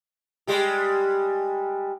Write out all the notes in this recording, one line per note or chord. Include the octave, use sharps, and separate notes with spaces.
G3 G#3 G4